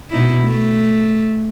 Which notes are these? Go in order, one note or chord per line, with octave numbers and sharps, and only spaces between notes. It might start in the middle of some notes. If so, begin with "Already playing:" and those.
B2 D#4 E4
A3